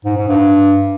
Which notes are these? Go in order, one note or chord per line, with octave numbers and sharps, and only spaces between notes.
G#2
G#2
G2